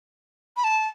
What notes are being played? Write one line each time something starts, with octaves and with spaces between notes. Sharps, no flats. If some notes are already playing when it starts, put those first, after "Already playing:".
B5
A5